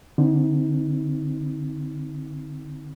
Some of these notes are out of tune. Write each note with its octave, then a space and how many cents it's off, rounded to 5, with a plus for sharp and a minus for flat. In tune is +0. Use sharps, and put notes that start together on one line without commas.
D3 +0 C4 +0 D#4 +40